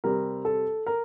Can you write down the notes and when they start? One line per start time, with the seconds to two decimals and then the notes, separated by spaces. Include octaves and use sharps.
0.04 C3 G3 C4 A#4
0.45 A4
0.86 A#4